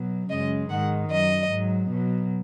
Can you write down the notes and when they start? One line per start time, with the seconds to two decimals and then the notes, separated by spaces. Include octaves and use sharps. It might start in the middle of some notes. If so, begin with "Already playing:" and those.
Already playing: B2 F#3
0.29 F#2 C#3 G#3 D#5
0.70 G#2 D#3 G#3 F#5
1.10 F#2 F#3 D#5
1.49 G#2 F#3
1.90 B2 F#3